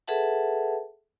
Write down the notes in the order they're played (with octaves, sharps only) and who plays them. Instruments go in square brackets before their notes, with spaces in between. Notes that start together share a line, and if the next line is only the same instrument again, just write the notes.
[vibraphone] G#4 A4 B4 E5 F#5 A5